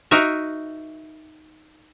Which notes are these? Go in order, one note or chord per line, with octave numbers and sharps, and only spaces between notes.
D#4 F#4 A#4 E5